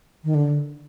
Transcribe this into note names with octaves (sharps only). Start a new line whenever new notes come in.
D#3
D3